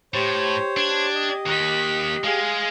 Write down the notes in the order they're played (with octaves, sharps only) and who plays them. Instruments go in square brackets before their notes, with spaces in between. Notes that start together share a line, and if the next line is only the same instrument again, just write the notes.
[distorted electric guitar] A2 [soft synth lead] G4 [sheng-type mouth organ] C5 C#5
[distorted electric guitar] D4 [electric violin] G#6
[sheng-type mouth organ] D#5
[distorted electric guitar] D#2 D#3 [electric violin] F#6 B6
[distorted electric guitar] G#3 [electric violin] G#4 F5